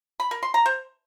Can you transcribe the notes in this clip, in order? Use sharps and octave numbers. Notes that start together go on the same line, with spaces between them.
B5
A#4
C6
A#5
C5